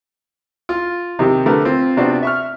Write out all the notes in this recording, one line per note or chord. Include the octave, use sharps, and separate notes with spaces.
F4
C3 D#3 G4
D3 A3 A#4 B4
C4 F4
C3 B3 C4 D4 F4 F#4
E5 C#6 F6